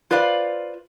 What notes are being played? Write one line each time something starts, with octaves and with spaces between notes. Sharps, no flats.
F4 B4 C5 D5 F5